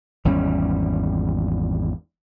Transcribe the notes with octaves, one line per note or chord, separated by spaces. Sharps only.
G#1 E2 G3 C#4